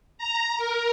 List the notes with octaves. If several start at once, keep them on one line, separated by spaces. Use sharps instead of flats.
A#5
A#4